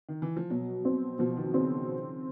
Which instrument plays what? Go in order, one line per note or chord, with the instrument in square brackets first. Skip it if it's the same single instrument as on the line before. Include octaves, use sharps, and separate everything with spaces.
[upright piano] D#3
E3
F3
[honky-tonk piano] B2 [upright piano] F#3
[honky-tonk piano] C4
[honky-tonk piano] B2 [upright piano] F3
[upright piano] D#3
[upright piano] C#3 [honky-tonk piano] C4